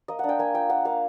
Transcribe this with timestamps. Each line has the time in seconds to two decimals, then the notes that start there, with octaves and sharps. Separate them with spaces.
0.08 A#3 D#5
0.19 D4 F#5
0.29 G5
0.39 A#3 G#5
0.54 F4 G5
0.70 A#3 F#5
0.85 A#3 F5